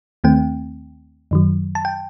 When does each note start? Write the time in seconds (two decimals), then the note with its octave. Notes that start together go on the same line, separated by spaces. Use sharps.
0.24 D#2 D#3 A3 C4 G5
1.31 F#2 D#3 F#3
1.75 A5
1.85 G5